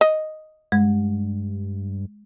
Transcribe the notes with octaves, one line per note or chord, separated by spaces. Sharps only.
D#5
G2 G#3